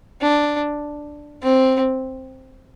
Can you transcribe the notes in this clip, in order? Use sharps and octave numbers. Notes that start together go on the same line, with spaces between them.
D4
C4